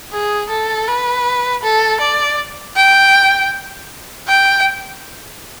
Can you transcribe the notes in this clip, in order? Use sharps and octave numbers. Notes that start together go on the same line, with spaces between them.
G#4
A4
B4
A4
D5
G5
G5